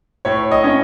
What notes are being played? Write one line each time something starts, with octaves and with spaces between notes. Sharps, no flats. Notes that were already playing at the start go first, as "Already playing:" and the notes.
A2 C#5
D#5
C#4